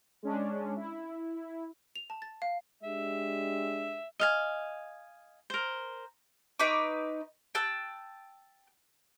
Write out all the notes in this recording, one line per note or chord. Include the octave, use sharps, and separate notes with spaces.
G#3 C#4 D4
E4
F7
A5
A6
F5
G#3 D4 G4 E5
D#5 F5 G#5
A#4 C5
D#4 B4 C#6 D6
G5 A5 E6 F#6